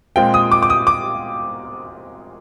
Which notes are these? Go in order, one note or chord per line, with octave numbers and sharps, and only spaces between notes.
A#2 G#3 C4 F4 G5
D#6
D6
D6
D#6
D6